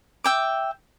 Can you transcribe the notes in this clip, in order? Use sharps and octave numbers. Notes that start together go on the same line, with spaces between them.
E5 G5 D6